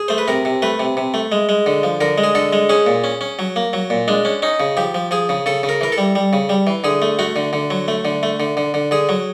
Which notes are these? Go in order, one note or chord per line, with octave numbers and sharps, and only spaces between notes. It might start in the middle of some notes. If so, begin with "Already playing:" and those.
Already playing: G#4
A3 C5
B4
C3 A#4
C3
A3 B4
C3
C3
A3
G#3
G#3
D3
F3
D3 A#4
G#3
G#4
D3 A4
G#3
C#4 G#4
A#2
C#4
C#4
F#3
A#3
F#3
A#2
G#3 D4
C#4
C#4 D#4
C#3
F3 G4
F3
F3 G#4
C#3
C#3 A4
C#3
A#4
E3 A#4
A4
G3
G3
C#3
G3
E3
D3 G#4
A3
A3 F#4
D3
D3
F#3
A3
D3
A3
D3
D3
D3
D3 G#4
F#3